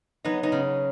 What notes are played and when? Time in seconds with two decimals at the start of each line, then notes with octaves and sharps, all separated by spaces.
0.25 F#3 B3 D#4
0.43 B3 D#4
0.52 C#3